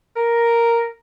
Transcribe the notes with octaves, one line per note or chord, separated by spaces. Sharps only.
A#4